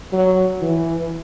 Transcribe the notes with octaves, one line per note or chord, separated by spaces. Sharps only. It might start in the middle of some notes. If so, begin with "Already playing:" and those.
F#3
E3